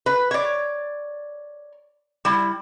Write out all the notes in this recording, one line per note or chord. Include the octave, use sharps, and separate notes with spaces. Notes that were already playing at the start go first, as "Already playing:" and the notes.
B4
C#5 D5
G3 E4